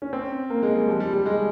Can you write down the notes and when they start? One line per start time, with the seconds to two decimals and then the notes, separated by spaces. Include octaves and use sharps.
0.02 C#4
0.13 C4
0.50 A#3
0.63 G#3
0.75 G3
0.88 F3
1.00 G3
1.13 G3
1.26 G#3